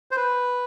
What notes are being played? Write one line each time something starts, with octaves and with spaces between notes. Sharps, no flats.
C5
B4